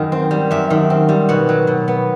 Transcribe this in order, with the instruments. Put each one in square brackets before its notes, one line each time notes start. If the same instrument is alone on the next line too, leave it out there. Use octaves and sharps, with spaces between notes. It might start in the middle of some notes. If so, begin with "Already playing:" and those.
Already playing: [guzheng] F#2 D#3 D#5
C4
G3
F#2 E5
D#3
C4
G3
B2 F#5
F#3
B2
B3